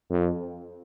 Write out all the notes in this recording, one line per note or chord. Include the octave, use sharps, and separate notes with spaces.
F2